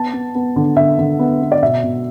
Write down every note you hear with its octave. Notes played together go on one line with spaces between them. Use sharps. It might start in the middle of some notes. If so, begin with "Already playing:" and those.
Already playing: B3 A5
B3
B3
D3
D3 E5
D3
B3
B3
D5
B2 E5
B2